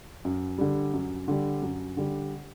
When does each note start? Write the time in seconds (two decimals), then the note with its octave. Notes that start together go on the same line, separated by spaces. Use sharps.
0.25 F#2
0.58 D3 G3
0.93 F#2
1.28 D3 G3
1.62 F#2
1.97 D3 G3